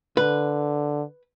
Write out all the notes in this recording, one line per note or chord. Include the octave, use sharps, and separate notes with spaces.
D3 B4